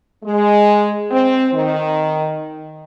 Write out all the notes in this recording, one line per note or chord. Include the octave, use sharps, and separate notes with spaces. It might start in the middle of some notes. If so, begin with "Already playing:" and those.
G#3
C4
D#3